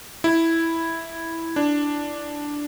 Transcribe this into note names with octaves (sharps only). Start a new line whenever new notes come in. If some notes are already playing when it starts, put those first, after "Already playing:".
E4
D4